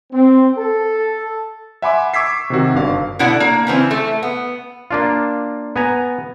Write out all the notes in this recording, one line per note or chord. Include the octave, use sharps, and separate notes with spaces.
C4
A4
E5 F#5 G#5 B5 C6 D6
C#6 D6 E6 G#6 B6 C7
C3 D#3 F#4
G1 D4 F5
B2 D3 E4 F#5
A#3
C#3 E3 C4
A3
B3
A#3 D4 F4
B3 G#5 A#5